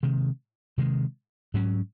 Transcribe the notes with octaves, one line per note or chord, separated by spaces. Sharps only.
C3 D#3 G#3
C3 D#3 G#3
G#2 F#3 C#4